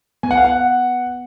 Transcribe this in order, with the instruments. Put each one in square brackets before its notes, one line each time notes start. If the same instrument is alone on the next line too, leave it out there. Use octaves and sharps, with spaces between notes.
[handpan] B3 [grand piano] G#5
[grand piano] F#5
F5
F#5